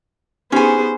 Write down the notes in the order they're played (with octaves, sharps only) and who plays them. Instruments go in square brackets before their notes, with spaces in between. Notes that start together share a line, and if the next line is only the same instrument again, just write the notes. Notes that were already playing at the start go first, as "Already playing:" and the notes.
[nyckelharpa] B3 G#4 [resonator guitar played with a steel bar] C#4 G#5 [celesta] D#4 G4 [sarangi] C5